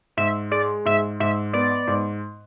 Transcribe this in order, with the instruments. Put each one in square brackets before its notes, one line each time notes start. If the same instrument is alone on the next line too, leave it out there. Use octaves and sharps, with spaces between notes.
[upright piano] G#2 [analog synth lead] E5
[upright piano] G#3 [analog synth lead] D5
[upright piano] G#2 [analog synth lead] E5
[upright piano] G#2 [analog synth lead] E5
[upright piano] B3 [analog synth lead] D5
[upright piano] G#2